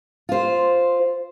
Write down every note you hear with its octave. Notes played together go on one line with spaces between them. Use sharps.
F4 C5